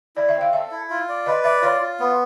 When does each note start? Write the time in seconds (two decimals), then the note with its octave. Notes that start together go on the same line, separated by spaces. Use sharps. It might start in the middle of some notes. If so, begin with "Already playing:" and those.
0.16 E4 D5
0.29 E5
0.35 C4
0.41 F5
0.53 A4 E5
0.71 E4
0.90 F4
1.09 D5
1.26 B4 D#5
1.44 D5 E5
1.62 F4 C#5
1.81 F4
2.00 B3